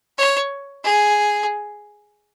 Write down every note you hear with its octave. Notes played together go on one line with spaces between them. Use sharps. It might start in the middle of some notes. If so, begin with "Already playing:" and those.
C#5
G#4